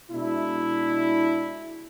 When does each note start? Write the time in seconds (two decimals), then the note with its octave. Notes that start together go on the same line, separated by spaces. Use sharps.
0.11 B2 G#3 D4 E4